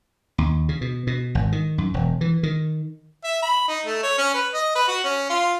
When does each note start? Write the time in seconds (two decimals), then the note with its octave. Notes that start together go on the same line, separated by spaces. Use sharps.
0.38 D#2
0.69 C#3
0.81 B2
1.07 B2
1.35 G#1
1.52 D#3
1.78 F#2
1.94 E1
2.21 E3
2.43 D#3
3.24 E5
3.42 B5
3.68 D#4
3.86 A3
4.03 C#5
4.18 C#4
4.34 B4
4.54 D#5
4.75 B4
4.88 F#4
5.04 C#4
5.29 F4